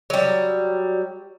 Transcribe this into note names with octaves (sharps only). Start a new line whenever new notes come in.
F#3 G3